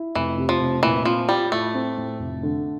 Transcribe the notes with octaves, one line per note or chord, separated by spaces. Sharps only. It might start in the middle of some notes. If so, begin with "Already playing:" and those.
Already playing: E4
F1 E3
C3
F3
F1
A#2 E3
F3 C4
G3 F4
A2 A3
C4
A2
F1
D3